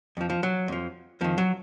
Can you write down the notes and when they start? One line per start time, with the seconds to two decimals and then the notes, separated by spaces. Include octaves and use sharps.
0.17 F2 F3
0.30 F3
0.43 F#3
0.68 F2 F3
1.21 F2 D#3 F3
1.38 F#3